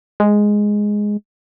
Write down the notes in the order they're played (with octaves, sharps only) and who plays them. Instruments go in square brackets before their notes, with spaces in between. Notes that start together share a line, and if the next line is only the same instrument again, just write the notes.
[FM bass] G#3